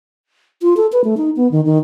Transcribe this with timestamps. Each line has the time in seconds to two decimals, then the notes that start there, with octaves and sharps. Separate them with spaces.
0.62 F4
0.77 A4
0.93 B4
1.04 A3
1.17 D#4
1.36 B3
1.52 D#3
1.65 D#3